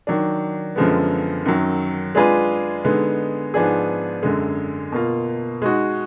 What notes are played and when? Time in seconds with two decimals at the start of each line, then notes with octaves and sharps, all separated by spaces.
0.07 D#3 F#3 D4
0.76 F#2 D3 F3 G#3 B3
1.45 F#2 D#3 F#3
2.15 G#3 D4 F4 G#4 B4
2.84 D3 G#3 B3 D#4
3.54 G#2 F3 B3 D4 G#4
4.23 F#2 D3 G#3
4.92 B2 A#3 F4
5.62 G#3 D#4 F#4